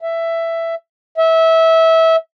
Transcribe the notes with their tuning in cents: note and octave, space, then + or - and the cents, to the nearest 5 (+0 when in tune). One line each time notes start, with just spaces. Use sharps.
E5 +10
E5 -20